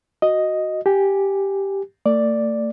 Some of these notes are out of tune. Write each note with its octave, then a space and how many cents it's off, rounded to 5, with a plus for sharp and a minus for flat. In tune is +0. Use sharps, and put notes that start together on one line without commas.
F#4 +0 D#5 +0
G4 -5 G#5 -10
A3 +40 D5 +0